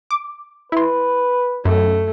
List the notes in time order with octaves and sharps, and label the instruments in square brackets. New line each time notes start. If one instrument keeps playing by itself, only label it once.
[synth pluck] D6
[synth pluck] E4 C6 [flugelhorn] B4
[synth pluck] F#2 [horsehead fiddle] A3